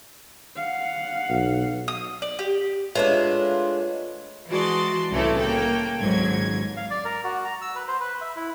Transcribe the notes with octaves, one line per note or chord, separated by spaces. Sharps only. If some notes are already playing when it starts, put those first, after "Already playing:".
F5 F#5
B1
D#6
D5
G4
G#3 A3 D4 F4 B4 C#5 E5
E3 G#3 F#4 D5 A5 C6
C2 A2 C#3 E3 A3 A4
A#3 A4 G5
G#1 C#2 G#2 F#3 G#6
F5
D5
A#4
F#4
A#5
E6
B4
C5
B4
E5
E4